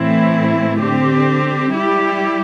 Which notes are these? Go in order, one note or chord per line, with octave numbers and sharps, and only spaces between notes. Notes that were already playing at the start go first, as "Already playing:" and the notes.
Already playing: A2 E3 A3 C4 E4
D3 C4 G4
G3 E4 G4